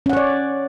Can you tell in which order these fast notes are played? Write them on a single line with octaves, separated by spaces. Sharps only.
C#4 F#5 C#5 D5